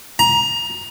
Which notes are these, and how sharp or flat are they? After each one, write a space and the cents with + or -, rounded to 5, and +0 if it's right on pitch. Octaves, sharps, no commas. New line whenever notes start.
A#5 +20